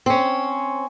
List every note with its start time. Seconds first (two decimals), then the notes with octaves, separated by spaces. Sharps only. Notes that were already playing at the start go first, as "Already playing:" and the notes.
0.06 C4 C#4